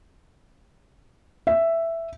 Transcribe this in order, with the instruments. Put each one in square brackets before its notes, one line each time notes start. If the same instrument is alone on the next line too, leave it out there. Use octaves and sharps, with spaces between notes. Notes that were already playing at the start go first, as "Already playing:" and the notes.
[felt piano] E5